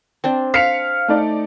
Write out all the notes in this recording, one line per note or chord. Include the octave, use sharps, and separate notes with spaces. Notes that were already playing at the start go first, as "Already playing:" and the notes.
C4 D4 C5
F5 B6 C#7 F7
A3 D#4 D5